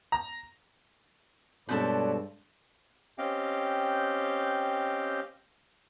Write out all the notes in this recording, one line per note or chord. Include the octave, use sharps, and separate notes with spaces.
A#5
G2 B2 G#3 C4 A4 B4 C#5 D5
C4 C#4 G4 D#5 F5 G5